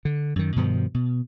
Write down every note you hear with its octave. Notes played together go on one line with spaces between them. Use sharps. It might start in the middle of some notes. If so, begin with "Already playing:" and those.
D3
F#2 D#3
G2 B2 D#3 F3
B2